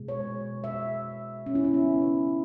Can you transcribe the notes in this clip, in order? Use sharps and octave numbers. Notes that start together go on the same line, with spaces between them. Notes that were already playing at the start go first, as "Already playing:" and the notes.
Already playing: B2 G#3
C#5
E5
C#4
E4
C#4
B3
C#4